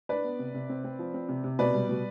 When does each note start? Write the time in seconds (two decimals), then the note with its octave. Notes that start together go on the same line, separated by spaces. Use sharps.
0.09 D4 B4 D5
0.24 B3
0.39 C3
0.54 C3
0.69 C4
0.84 C4
0.99 F3
1.14 C4
1.29 C3
1.44 C3
1.59 B2 B4 D5
1.74 G3
1.89 B2